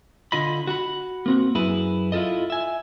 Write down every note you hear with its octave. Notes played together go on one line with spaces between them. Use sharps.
D3 F4 D#5 B5
F#4 F#5 B5
A#3 C4 F#4
F#2 E4 G#4 B4 B5
E4 F4 G4 A4 D#5
E5 G#5